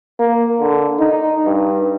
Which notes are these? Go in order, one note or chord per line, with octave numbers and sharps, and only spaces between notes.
A#3
D3
D#4
G2